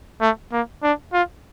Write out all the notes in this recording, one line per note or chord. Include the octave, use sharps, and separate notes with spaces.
A3
A#3
D4
F4